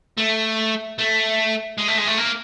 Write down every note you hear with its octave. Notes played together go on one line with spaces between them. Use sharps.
A3
A3
G#3
A3
G#3
A3
A#3